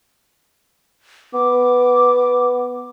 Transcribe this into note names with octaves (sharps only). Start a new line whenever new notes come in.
B3 D6